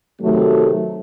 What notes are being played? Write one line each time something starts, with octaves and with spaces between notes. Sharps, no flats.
C3 D#3 F#3 A3